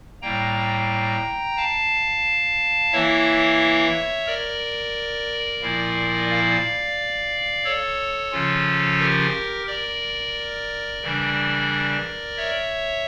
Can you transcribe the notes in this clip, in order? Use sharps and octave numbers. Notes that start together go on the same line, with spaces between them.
A2 G3 A#3 G5 A#5
F5 A5
E3 A#3 E4 C#5 E5
A#4 D5
A#2 F3 A#3 E4
D5 F5
A4 C#5
C#3 F3 C#4 F4
G4 A#4
A#4 D5
C#3 E3 G3 D4
C#5 E5